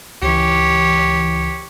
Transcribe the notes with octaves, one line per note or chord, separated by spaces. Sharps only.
C#2 E3 G4 C#5